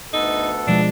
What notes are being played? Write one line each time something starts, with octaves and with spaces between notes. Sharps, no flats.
D2 B3 D#4 A4
B2 F3 G#3 D4